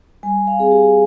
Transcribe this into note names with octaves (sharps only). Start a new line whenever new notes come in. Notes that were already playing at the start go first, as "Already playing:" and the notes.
G3 G#5
F5
C4 G#4
G4